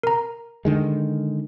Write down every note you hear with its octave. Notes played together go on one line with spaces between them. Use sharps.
A#4 A#5
D3 D#3 G#3